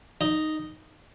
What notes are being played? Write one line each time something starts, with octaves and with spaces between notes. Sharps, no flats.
D#4